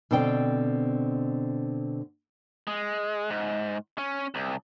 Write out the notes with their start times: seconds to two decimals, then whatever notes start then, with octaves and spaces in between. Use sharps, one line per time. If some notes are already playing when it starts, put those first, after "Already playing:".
0.11 B2 D3 C4 D5 G5
2.67 G#3
3.30 G#2
3.98 C#4
4.35 C2